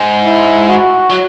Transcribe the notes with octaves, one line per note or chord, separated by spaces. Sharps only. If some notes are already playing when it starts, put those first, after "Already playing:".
Already playing: G#2
E4
F#4
F#3